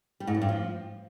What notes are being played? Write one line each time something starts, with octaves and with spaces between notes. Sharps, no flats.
G3
G#2
F#2
G2
F3